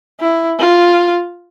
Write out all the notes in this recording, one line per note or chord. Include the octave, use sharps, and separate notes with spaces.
E4
F4